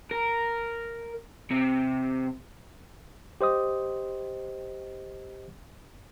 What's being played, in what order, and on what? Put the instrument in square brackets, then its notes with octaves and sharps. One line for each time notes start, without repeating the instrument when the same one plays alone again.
[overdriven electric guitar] A#4
C3
[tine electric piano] G4 C5 D#5 D#6